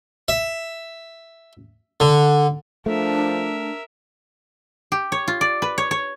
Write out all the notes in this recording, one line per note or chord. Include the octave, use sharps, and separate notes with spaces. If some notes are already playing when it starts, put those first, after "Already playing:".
E5
D3
F3 A3 D4 A#4 E5
G4
C#5
F4
D5
B4
C#5
C#5